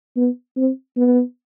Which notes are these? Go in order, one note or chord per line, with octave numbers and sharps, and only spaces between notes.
B3
C4
B3